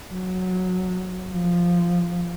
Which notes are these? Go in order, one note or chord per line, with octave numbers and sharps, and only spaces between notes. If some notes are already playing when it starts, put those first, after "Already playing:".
F#3
F3